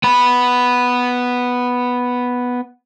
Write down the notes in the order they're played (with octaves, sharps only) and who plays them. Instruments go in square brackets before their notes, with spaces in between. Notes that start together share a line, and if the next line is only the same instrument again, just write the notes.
[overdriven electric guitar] B3 B5